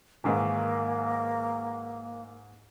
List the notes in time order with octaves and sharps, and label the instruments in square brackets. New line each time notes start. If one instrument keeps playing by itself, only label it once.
[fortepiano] G#2 D#3 E3 [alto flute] A#3